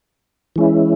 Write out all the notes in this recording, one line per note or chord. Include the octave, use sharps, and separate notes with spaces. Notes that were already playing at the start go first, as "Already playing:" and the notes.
E3 G#3 C#4 E4